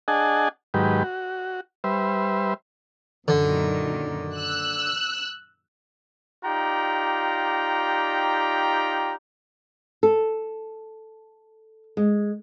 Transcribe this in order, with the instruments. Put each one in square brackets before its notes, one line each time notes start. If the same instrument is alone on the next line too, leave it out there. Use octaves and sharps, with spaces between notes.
[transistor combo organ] D4 G#4 D#5 F#5 G#5 A5
G#2 D#3 F#3 G4 B4
F#4
G3 B4 C5 E5
[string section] F#2 A#2 D#3 [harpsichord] D3
[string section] E6 F#6
[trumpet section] D#4 F4 G4 D5 G5 A#5
[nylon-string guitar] A4
G#3